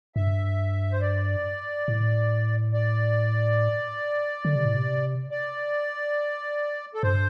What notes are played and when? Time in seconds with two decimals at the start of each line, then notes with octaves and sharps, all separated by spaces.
0.15 G2 E5
0.92 C5
1.01 D5
1.88 A2
2.73 D5
4.45 D3
4.55 C3
4.65 A2
4.76 C3
5.31 D5
6.94 A4
7.03 G2 C5